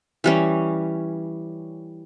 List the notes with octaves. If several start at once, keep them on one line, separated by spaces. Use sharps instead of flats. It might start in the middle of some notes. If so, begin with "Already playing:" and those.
E3 G3 C#4